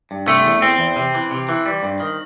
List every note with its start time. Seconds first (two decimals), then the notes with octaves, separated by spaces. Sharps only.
0.11 G2
0.28 C3 A3
0.44 E2
0.61 E2 C4
0.79 E2
0.96 C3
1.14 E3
1.31 C3
1.49 E3
1.66 G3
1.83 G2
2.00 D#3